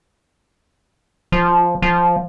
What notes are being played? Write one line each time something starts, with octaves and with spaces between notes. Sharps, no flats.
F3
F3